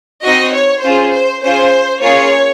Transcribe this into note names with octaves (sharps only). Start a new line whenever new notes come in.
C4 D#4 F#4 D#5
C#5
C#4 F4 G#4 C5
C5
C#4 F4 G#4 C5
A#3 C#4 F4 G#4 C#5